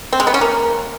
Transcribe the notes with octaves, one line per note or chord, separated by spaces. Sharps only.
C4
G#3
B3
C#4
A#3